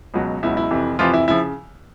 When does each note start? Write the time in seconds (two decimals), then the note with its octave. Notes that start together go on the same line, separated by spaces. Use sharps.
0.14 C#2 B2 F#3
0.43 C#2 B2 F#3 E4
0.57 E4
0.71 F2 C3 E3
0.99 F2 C3 E3 F3 F4
1.14 E4
1.28 C#3 F3 E4